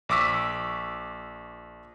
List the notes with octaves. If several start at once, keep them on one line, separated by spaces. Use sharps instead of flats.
A#1 C#6 D6 E6 B6